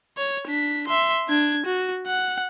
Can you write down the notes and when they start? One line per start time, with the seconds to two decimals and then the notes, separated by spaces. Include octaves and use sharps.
0.17 C#5
0.48 D4 B6
0.87 E5 C6
1.29 D4 G#6
1.66 F#4
2.07 F#5